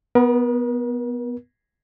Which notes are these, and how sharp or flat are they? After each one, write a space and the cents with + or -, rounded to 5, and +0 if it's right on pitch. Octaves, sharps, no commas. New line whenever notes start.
B3 +0 A#4 +45